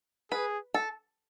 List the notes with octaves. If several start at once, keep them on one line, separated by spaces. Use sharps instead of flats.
G#4 B4
A4